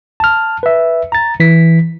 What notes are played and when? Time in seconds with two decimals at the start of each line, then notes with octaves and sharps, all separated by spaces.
0.20 A5 F6
0.63 B4 E5
1.12 A#5 A6
1.40 E3 B6